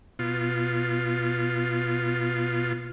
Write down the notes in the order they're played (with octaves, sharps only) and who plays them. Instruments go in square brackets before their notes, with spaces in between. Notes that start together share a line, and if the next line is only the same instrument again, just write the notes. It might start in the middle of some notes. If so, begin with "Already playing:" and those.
[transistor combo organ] B2 F4